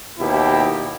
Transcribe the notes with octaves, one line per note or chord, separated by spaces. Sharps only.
D#2 B2 E4 G4